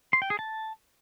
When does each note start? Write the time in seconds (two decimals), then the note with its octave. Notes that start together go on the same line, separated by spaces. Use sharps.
0.13 C6
0.22 G5
0.30 G#4
0.39 A5